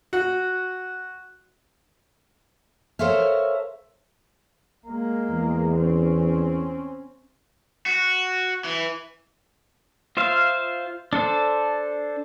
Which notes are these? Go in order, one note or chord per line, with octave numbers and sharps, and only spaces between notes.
F#4
A4 A#4 C5 C#5 E5 F5
G#3 A#3
E2
C4 C#4
F#4
E3
F4 C5 E5 F5
D4 A4 C5